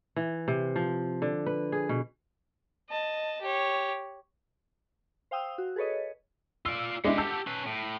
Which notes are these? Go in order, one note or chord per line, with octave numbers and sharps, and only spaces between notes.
E3
C3
F3
D3
B4
G#4
B2
D#5 A5
G4 C#5
C5 F5 G5 D#6 E6
F#4
G#4 A4 B4 C#5 D#5
F4 D5 E6
G#3 D4 E4 G4 F#5
A5 E6 G6
C#4 B4
A2